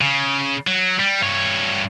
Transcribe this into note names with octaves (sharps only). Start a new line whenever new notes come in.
C#3
F#3
G3
G2 C#5